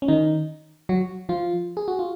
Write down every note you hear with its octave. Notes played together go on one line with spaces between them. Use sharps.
C#4
D#3 D#4
F#3 F#4
F3 F4
G#4
F#4
F4